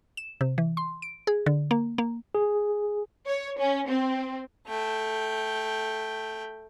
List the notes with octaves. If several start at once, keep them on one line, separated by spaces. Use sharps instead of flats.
E7
C3
E3
C6
D7
G#4
D3
A#3
A#3
G#4
C#5
C#4
C4
A3 G5